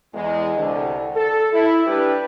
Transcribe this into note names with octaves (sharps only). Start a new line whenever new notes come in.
E2 G#3
C2 D3
A4
E4
G3 D4 G4 B4